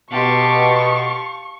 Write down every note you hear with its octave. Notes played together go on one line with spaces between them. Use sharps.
B2 G4 F5 A5 C6 C#6